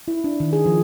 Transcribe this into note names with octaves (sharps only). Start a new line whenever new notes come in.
E4
D4
D#3
G#4
F3